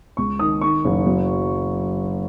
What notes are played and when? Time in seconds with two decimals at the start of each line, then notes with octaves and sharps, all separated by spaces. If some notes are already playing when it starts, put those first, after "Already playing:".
0.17 C#2 C#6
0.39 D#3 D#6
0.61 D#3 C#6
0.85 F#1
1.07 F#3